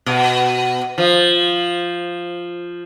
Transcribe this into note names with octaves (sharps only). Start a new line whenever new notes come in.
B2
F3